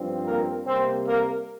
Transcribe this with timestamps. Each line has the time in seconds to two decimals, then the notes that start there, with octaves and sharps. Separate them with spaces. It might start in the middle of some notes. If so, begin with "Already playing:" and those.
Already playing: G2 F3 C4
0.25 A#3 A#4
0.66 C3 G3 A#3 C4 C5
1.06 A#3 A#4